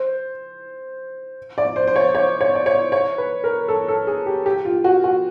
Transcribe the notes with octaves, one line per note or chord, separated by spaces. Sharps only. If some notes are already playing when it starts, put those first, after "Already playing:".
Already playing: C5
D5
C5
C5
C#5
C#5
C#5
D5
C#5
C#5
B4
A#4
A4
A4
G#4
G4
G4
F4
F#4
F#4